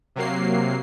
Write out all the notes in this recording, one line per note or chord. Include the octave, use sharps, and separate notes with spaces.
C3 F#3 A#3 C7